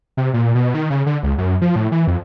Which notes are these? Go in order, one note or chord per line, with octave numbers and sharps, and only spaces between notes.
C3
A#2
B2
D#3
C#3
D3
C#2
F#2
F3
A2
E3
F2